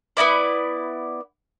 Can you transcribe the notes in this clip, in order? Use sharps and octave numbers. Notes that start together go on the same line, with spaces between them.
B3 D#4 E4 D5